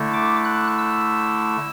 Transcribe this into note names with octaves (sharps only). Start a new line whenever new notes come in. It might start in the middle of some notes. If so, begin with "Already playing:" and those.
Already playing: D3 A3 E4
D6
F#6
E6